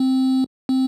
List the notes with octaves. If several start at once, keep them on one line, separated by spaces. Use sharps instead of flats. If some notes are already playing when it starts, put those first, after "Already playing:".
Already playing: C4
C4